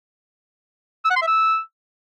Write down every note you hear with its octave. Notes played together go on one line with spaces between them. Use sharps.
E6
F#5
C6
E5
E6